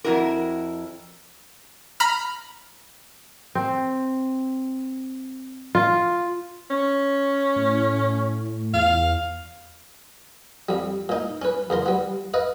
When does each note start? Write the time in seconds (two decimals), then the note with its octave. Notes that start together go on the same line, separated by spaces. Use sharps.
0.04 F2 B2 E4 F#4 A#4
2.00 A#5 B5 F6
3.55 C4
5.75 F4
6.70 C#4
7.56 A2
8.73 E2 F5
10.69 F2 G3
11.09 A#2 D#4
11.42 C#4 B4
11.70 E2 C#3 A#4 C6
11.86 G3 B3
12.34 B4 D#5 F5